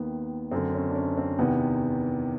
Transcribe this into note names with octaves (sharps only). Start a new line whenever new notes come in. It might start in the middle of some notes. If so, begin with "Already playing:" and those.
Already playing: D#2 D#3 B3
F#2 D3 C4
C#4
D4
C#4
C4
E2 C3 D#3 B3